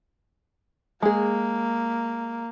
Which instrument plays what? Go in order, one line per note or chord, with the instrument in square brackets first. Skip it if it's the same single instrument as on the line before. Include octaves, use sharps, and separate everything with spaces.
[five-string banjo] G#3 G#4 [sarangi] A#3